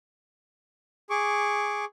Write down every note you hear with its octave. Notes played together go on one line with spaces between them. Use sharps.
G#4 C#6 D6